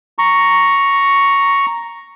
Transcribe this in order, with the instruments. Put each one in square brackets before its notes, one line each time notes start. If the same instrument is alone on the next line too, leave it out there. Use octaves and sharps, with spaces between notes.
[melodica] A#5 C#6